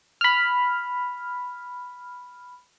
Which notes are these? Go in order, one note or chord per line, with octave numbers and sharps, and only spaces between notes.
B5 F6